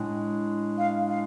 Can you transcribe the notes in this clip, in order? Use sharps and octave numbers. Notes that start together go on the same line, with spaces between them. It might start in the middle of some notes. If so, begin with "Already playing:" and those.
Already playing: A2 G#3 D4
F5
F5